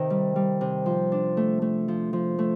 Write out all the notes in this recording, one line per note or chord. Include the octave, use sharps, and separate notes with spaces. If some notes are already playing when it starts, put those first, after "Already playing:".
Already playing: C3 D#3
G3
G3
C3
F3
D4
A3
A3
F3
F3
A3